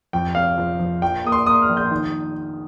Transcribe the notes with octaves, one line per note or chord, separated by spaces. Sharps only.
F2 G5
F1 F5
F3
F3
A#1 G5
A#3 D#6
C6
A#3 D#6
F6
A#1
G6
D#3